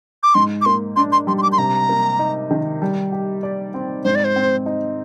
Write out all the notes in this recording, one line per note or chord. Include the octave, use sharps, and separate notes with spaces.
D6
G#2 C6
D6
A#3 C6
D4 C6
C6
G3 C6
C6
D6
C6
C3 A#5
A#3
D#4
D#3
G3
G4
D5
C4
G#2 C5
D5
C5
C4
D#4